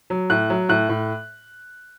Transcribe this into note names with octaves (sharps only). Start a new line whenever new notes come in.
F#3
A2 F#6
F#3
A2 F#6
A2